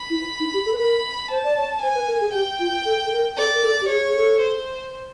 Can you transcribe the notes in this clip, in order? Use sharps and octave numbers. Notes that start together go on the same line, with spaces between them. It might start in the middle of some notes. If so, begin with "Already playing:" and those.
Already playing: B5
E4
D#4
G4
A4
B4
A#4 B5
C5 A5
D5
C#5
C5 G#5
B4
A#4
G#4
G4 G5
F4
A4
A4
A#4
A4 D5
A#4
A4
G4
G#4 C#5
G#4
A4
C5